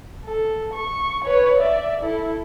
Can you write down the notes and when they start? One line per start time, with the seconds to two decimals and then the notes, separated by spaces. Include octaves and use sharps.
0.25 A4
0.74 C#6
1.25 B4 C#5
1.59 D5 E5
2.02 E4 A4